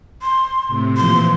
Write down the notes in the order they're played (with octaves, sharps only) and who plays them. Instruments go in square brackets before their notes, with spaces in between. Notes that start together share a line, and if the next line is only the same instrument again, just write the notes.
[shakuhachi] C6
[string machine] A2 C3
[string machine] A#2 E3 F3 [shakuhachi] C6